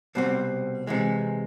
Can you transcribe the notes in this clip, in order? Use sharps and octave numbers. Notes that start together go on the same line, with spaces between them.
C2 B2 G3 C4
C3 E3 G#3